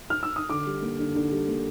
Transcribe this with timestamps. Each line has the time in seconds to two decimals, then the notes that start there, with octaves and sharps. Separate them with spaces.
0.10 F6
0.23 E6
0.36 D#6
0.50 D3 D6
0.66 G3
0.82 A#3
0.99 D3
1.15 D3
1.31 G3
1.48 A#3